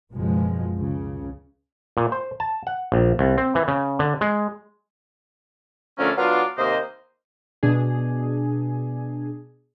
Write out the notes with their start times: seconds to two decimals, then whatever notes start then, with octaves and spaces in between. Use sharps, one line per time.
0.13 F#1 G#2 B2 F3 G#3
0.76 C#2 C#3
1.97 A#2
2.12 C5
2.40 A5
2.67 F#5
2.92 A#1
3.19 C2
3.38 C4
3.55 E3
3.68 C#3
3.99 D3
4.21 G#3
5.99 D3 F3 A3 C#4 D4 A#4
6.18 F#3 B3 D4 F4 D5 F5
6.58 D#2 C3 A#3 C5 D#5
7.63 B2 D4 G#4